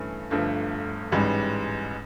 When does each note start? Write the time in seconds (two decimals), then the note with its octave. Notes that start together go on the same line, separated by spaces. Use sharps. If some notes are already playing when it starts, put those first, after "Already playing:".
Already playing: G2 E3 A3 C#4
0.30 G1 G2 D3 F3 A3
1.12 A1 G#2 E3 G3